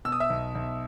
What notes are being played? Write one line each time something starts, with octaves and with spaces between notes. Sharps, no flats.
B2 E6
D#6
E5 E6
B1
B1